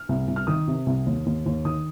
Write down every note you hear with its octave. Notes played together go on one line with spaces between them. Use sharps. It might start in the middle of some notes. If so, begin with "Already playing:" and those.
Already playing: F6
C2
C2
F6
D#3 D#6
C3
C2
D#2
D#2
D#2
D#3 D#6